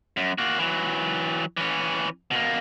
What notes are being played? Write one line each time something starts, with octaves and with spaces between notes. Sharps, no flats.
F#2
A#3 F#4
E3 F#3
E3 C#4
B2 A#3